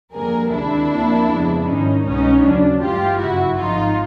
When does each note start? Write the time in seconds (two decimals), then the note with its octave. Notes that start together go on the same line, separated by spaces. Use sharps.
0.13 F2 D3 G3 A#3 G#4 A#4
0.51 D2 C3 D#3 G#3 D4 E4
0.89 D2 C3 F3 A#3
1.28 F2 C#3 F3 G#3 B3
1.66 G#2 D#3 G3 C#4 D#4
2.04 C2 B2 G#3 B3 C#4 D#4
2.42 D#2 C#3 F#3 D4
2.81 G1 G2 E3 G#3 F4 G4
3.19 G1 F#2 C#3 F#3 E4 F#4
3.57 G#1 G#2 F3 D#4 F4